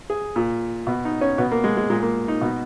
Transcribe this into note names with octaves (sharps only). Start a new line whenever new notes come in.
G#4
A#2
B2
D#4
C#4
B2 B3
A#3
G#3
G#3
A#2 G#3
A#3
D#4
B2